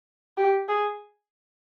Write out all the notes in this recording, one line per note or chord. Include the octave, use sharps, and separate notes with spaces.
G4
G#4